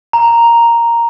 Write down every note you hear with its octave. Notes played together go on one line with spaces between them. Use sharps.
A#5